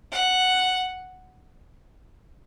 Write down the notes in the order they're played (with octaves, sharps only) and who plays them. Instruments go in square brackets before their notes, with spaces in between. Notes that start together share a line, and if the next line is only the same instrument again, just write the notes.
[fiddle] F#5